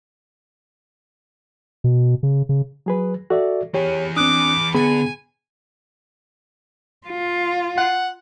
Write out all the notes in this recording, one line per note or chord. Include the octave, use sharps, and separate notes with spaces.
B2
C#3
C#3
F#3 G#4 B4
F#4 A4 D5 E5
E3 G4 G#4 C#5
C4 D4 D6 D#6 F#6
D3 B3 G#4 G#5 B5
F4
F#5